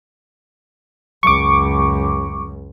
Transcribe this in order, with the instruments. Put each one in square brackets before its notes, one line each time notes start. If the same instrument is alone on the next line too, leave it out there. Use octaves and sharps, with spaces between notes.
[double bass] C#2 F#2 [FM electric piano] C#6 D6